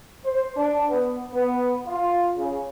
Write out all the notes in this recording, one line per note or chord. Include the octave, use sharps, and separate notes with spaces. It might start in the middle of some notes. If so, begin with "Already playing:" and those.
C5
D4
B3
B3
F4
C#3